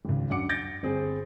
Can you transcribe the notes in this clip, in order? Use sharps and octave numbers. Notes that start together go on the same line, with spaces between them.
G#1 C#2
F#2 D4 F#5 D6 C#7
G6 A6 A#6 D7
G1 C4 G#4